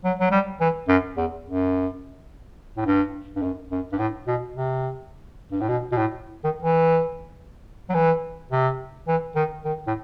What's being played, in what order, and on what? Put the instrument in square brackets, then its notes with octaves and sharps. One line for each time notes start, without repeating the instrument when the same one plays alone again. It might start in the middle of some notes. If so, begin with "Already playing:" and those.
[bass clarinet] F#3
F#3
G3
E3
F#2
E2
F#2
A2
G2
G2
F#2
F#2
G2
A2
B2
C3
G2
A2
B2
B2
A2
D#3
E3
F#3
E3
C3
E3
D#3
D#3
A2